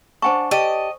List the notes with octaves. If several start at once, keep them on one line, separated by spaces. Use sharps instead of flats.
D4 C5 F#5 G#5 A5 C#6
G4 D5 D#5 A5